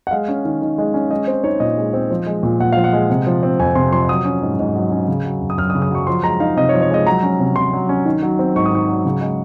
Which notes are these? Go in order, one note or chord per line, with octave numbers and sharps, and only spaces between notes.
F#5
G#3 F5
C#4
D#3
D#3
G#3
C#4
G#3 D#5
C4 C5
D#4 C#5
A#2 D#5
G#3
C4
F3
G#3
A#2
A#2 F#5
F3 F5
F#5
G#3
C3
F3
C4
F2 G#5
C3 C6
F3 C6
F#3 D#6
C#4
G#2
G#2
F#3
C#4
C#3
F#3
F#2
D#6
F#2 F6
D#6
C#3
D#6
F#3 C#6
F3 C6
G#3 A#5
D#4 F5
C3 D#5
C#5
F3
C#5
G#3 D#5
F#3 A#5
C#4
C3
C3 C6
F#3
C#4
D#3
F#3
C4
G#2 C#6
D#6
D#3 C#6
F#3
C#3
G#3